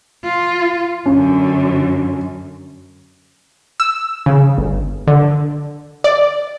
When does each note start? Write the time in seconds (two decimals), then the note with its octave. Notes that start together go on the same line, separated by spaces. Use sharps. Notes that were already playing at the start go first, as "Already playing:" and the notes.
0.24 F4
1.06 F#2 D3 C#4
3.80 E6
4.26 C#3
4.58 G1
5.07 D3
6.04 D5